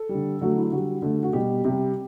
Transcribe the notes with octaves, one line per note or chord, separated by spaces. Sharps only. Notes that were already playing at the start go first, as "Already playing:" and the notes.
Already playing: A4
G3
D3
D3 F#3 A3 F#4
E4
D3 G3 F#4
D3 A3
F#4
B2 G3 G4
C3 G3